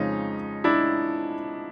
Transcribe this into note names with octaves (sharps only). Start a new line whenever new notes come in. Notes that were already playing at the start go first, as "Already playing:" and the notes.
Already playing: F2 C#3 F3 G#3 C#4 D#4
D4 E4